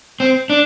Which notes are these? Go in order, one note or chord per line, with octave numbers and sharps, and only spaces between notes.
C4
D4